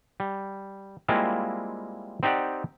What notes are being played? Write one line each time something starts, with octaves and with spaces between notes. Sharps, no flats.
G3
G3 G#3 A#3 C4 E4 F4
C4 D#4 G4 D5 F#5